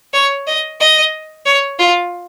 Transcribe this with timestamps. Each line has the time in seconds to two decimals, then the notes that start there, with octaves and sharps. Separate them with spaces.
0.13 C#5
0.47 D#5
0.80 D#5
1.46 C#5
1.79 F4